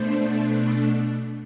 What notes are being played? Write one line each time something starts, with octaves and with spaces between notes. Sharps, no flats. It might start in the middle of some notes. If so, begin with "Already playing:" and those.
Already playing: B2 A3 D4 C5